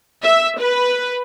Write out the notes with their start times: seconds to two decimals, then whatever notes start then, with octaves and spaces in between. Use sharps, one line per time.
0.23 E5
0.60 B4